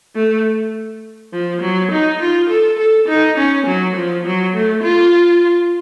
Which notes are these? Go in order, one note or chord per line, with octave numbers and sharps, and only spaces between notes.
A3
F3
F#3
D#4
F4
A4
A4
D#4
C#4
F#3
F3
F#3
A3
F4